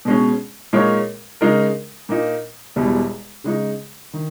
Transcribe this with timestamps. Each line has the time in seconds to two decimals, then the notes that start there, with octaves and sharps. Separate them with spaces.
0.05 B2 G#3 C#4
0.73 A#2 G#3 D#4 A#4 C#5
1.41 C#3 G#3 D#4 A#4
2.09 A#2 A#3 D#4
2.76 E1 E2 B2 G3
3.44 C#3 G#3 D#4
4.13 D#3